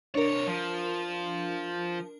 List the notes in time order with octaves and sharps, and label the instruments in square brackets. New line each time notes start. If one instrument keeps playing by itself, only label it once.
[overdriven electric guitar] C2 C#5 [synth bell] D4 A#4
[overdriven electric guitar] F3